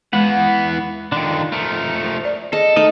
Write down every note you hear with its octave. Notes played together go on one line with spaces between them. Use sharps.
E3 G#3 B3 F#5
D3 D#3 D4 F4
F3 A3 A#4
D5
G#4 A4 D#5
A3 D#4 A#4 D#5